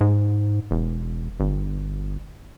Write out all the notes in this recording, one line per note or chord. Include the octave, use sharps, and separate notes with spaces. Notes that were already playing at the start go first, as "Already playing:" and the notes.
G#2
E1
G1